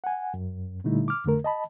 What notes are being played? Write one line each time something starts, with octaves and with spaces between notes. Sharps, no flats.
F#5 G#5
F#2
A#2 D3 G3 A3 D#4 E4
D6 F6
F2 D3 A3 A#4
D#5 A5 B5